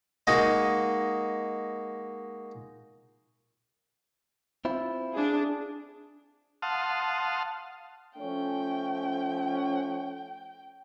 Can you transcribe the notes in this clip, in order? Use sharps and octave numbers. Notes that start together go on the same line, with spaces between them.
G#3 A#3 D#4 F#4
C4 E4 F4
D4 G#4
F5 F#5 A5 C6 D#6 F6
F3 A3 C#4 G5